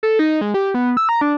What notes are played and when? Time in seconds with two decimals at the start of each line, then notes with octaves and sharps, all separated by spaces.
0.03 A4
0.19 D#4
0.41 G#3
0.54 G4
0.74 B3
0.97 E6
1.09 A#5
1.21 D4